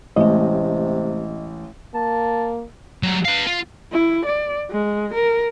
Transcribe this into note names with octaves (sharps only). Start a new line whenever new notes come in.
A1 C3 G#3 A3 D#5
A#3 A5
F#3 G3
B4 F5
F4
E4
D5
G#3
A#4